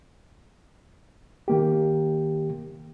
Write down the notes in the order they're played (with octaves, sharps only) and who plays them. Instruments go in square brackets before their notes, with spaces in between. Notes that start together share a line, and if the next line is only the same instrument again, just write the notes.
[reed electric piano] D#3 A#3 G4